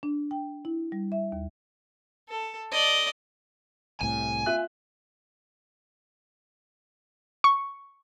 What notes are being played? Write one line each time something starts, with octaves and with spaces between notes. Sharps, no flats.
D4
G5
E4
G3
E5
D#2
A4
D5 D#5
C2 A2 C3 G#5
F4 E5 F#6
C#6